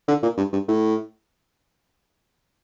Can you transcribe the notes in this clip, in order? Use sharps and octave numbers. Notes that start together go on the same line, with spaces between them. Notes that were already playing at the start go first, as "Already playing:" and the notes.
D3
A#2
G2
G2
A2